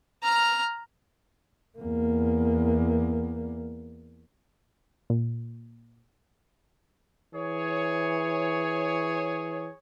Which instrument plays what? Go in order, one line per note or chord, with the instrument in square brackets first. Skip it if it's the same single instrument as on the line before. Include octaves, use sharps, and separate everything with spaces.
[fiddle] A#5 F6
[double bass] E2 A#3
[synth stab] A#2
[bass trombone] E3 [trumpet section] G#4 C#5